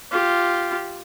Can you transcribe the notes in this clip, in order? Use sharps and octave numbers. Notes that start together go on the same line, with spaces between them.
F4 G4